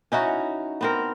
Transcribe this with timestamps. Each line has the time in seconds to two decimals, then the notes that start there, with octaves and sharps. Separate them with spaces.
0.12 C#4 D#4 E4 F#4
0.81 B3 C4 A#4